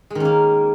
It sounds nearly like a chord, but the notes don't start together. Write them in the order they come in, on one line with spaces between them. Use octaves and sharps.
G#3 D#3 C#4 A#3